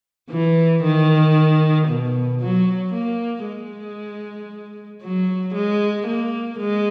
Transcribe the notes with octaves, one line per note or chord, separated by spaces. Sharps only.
E3
D#3
B2
F#3
A#3
G#3
F#3
G#3
A#3
G#3